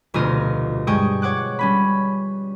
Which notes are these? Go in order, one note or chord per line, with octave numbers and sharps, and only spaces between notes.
F1 D2 B2 F4 D#5 F6
G2 G#3 G5 C#6 D#6
C#5 F#5 D6 F#6
G3 C#4 B5